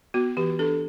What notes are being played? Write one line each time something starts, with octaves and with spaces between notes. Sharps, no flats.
B3 F#4
E3 G4
D4 A4